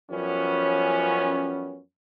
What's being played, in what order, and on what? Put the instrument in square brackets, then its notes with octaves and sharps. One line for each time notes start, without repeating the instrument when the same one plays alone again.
[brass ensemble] F#2 F3 G3 B3 C#4